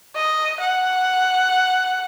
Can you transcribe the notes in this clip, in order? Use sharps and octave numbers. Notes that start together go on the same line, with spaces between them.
D#5
F#5